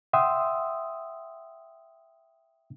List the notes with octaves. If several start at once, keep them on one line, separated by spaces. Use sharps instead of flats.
E5 F#5 G5 C6 D#6 E6